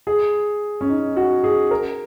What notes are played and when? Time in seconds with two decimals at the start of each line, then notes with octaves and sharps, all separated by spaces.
0.07 G#4
0.81 C#4
0.89 D#4
1.16 F#4
1.44 G#4
1.71 A#4